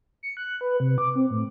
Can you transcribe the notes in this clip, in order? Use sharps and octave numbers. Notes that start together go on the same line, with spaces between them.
C#7
F#6
B4
C3
D6
C4
A2